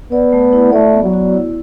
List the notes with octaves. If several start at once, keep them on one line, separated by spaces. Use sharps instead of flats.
B3 D5
A3
E4
A3 D5
B3
F#3
F#4
E4